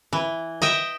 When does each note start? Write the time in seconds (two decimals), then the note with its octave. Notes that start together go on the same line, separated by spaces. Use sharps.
0.13 E3
0.62 D#5 E5 G5